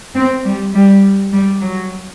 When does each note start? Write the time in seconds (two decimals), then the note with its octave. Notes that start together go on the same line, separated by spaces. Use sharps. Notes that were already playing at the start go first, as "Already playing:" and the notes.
0.14 C4
0.44 G3
0.74 G3
1.32 G3
1.62 F#3